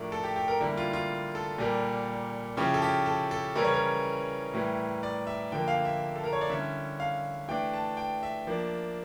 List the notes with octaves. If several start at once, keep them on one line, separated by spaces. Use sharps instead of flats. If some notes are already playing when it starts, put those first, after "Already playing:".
Already playing: A2 F3 A3 D4 A#4
A4
G4
G4
A#4
D3 G3 A#3 E4
F4
F4
A4
A#2 G3 A#3
C#3 F3 C#4 E4 G4
A4
G4
A4
A4
C#3 E3 G3 C#4 E4 A#4
C#5
A#4
A2 E3 G3
D5
E5
D3 F3 A#3 G5
F5
E5
A4
A#4
C#5
D5
D3 G3 C#4 E4 E5
F5
E3 A3 D4 G5
A5
G5
E5
F3 A#3 D4